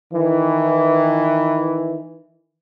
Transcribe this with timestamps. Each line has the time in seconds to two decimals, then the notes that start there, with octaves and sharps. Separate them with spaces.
0.13 D#3 E3